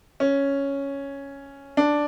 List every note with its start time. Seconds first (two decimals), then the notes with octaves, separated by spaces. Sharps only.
0.20 C#4
1.77 D4